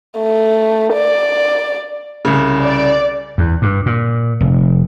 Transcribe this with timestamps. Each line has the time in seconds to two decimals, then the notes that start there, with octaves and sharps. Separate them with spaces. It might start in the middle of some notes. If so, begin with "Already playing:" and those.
0.19 A3
0.93 D5
2.25 C2 C#3
2.62 D5
3.38 E2
3.62 G2
3.86 A#2
4.41 F1